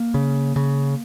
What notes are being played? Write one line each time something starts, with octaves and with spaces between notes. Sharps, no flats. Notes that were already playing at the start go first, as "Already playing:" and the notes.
Already playing: A#3
C#3
C#3